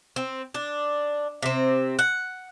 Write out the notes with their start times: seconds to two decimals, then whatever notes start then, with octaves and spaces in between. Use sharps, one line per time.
0.16 C4
0.54 D4
1.42 C3 C4
1.99 F#5